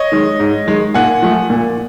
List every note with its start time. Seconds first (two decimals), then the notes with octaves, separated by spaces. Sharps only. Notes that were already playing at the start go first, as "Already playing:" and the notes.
Already playing: C#5 D#5
0.12 D#3 G#3
0.40 G#2
0.68 D#3 G#3
0.94 A#2 F#5 G#5
1.22 F3 A3
1.50 A#2